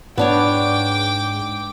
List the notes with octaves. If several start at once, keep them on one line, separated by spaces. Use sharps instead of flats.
G#2 B3 D4 C#5 G5 D6